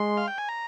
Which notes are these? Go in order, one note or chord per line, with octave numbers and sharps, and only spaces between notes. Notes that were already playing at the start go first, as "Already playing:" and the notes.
Already playing: G#3 C6
F5
G5
G#5
A#5